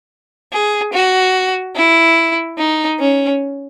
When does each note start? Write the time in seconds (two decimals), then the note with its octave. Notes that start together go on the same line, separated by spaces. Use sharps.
0.53 G#4
0.93 F#4
1.76 E4
2.58 D#4
2.99 C#4